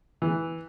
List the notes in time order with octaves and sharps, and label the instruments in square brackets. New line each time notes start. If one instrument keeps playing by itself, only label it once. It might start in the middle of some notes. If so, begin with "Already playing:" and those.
[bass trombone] E2 [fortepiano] E3